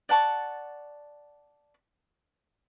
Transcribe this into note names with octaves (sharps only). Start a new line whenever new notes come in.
D5 F#5 A5 C#6